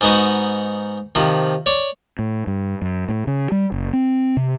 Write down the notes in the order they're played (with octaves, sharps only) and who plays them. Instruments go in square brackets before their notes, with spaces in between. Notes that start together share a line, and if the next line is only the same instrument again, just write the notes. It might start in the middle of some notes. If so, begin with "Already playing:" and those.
[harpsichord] G#2 B3 D#4 F#4
C3 D#3 F3
C#5 D5
[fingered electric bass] A2
G2
F#2
A2
C#3
G3
F#1
C4
C3